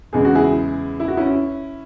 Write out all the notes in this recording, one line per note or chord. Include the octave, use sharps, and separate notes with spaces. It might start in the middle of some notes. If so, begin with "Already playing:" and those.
E2 C#3 G#3 G#4
F#4
E4 G#4
E4
F#4
C#4 E4